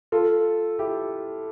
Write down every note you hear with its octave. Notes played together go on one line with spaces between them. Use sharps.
F4 A4
E4 G4